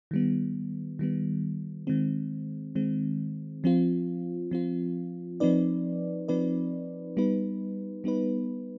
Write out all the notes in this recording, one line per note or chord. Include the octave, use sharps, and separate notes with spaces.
D#3 G3 B3
D#3 G3 B3
D#3 G#3 C4
D#3 G#3 C4
F3 C4 F4
F3 C4 F4
F3 C4 D#4 B4 D5
F3 C4 D#4 B4 D5
G3 B3 D#4 B4
G3 B3 D#4 B4